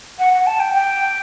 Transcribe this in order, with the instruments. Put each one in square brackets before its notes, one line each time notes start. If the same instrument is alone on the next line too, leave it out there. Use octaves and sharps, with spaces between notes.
[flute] F#5
F#5
A5
G5
G5